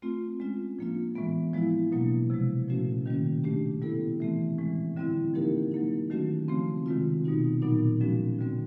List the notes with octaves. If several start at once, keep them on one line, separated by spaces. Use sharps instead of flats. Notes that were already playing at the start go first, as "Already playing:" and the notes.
A3 C4 F4
G#3 C#4 F4
A2 F3 A#3 D4 F4
A2 E3 G#3 B3
F3 G#3 B3 E4
B2 F#3 A#3 D4
C3 F3 G#3
A#2 F3 A3 C#4 F#4
D#3 G3 A#3 C#4
A3 D4 G4
G3 B3 E4 A4
E3 A3 C4
A2 E3 G#3
D3 G3 C4 E4
F3 A#3 D#4 G4 A#4
F#3 A#3 D#4
D#3 F#3 A3 C#4 F#4
C#3 F3 A3 C4
C3 D#3 G#3 C4 F4
B2 G3 B3 D#4 F#4
A#2 F#3 B3 D#4
F3 G#3 C#4 F#4
D3 G3 C4